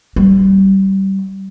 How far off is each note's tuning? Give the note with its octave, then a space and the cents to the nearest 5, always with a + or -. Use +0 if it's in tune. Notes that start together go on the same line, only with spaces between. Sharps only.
G3 -20